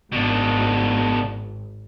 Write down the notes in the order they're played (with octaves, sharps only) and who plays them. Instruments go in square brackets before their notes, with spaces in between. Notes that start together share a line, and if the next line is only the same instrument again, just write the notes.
[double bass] G#1 [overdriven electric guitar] B2 D4